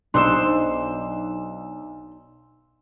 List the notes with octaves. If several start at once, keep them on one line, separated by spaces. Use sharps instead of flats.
B1 D4 D#4 C5 C6 E6 E7